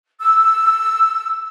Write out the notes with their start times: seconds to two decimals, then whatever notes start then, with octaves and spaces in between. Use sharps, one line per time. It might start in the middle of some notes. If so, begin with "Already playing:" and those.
0.21 E6